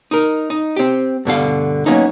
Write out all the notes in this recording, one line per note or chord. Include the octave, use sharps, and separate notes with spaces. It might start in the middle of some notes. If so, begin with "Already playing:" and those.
D#4 A#4
D#4
C4 G4
G2 B2 D3 F5
F#3 A#3 B3 C#4 D#4